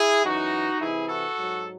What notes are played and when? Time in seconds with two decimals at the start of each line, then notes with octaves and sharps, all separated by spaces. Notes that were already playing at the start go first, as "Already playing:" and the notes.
Already playing: E4 G#4
0.23 F#2 E3 D#4 F#4
0.79 C3 E3 E4 G#4
1.07 F#4 A4
1.36 G#2 F#3